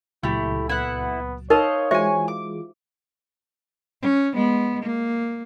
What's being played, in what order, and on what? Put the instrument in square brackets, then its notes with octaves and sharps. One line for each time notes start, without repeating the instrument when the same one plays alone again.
[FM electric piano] C#2 A#2 F#3 [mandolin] A3 G4 [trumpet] E4
[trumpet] B3 [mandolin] E4 F#5
[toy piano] D#4 A#4 [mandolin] C5 D#5 F5 [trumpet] C#5
[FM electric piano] E3 G#3 F4 [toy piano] F#4 C5 E5 [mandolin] G#5 C#6
[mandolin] D6
[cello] C#4
G#3 B3
A#3